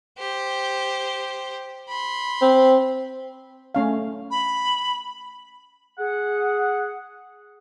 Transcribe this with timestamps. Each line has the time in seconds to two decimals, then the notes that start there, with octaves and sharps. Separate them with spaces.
0.18 G4 C5
1.89 B5 C6
2.42 C4
3.75 A3 C#4 F5
4.31 B5
5.98 G#4 F#5